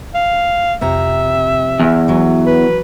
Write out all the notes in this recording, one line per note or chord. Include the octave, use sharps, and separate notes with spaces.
F5
F2 C3 E5 A#5
E2
E3 F#3
B4